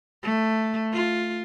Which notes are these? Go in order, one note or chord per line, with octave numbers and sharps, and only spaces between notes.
A3
F4